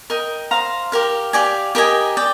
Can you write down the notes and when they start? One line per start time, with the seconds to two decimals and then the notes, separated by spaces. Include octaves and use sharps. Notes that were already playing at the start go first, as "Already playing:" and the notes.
0.10 A#4 D#5 G5
0.51 C5 F5 A#5
0.92 G4 A#4 F5
1.33 G4 D5 F5 G#5
1.75 G4 A#4 D#5 G#5
2.17 D5 G5